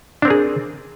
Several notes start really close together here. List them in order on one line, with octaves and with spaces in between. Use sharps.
D4 C4 A#4 G#4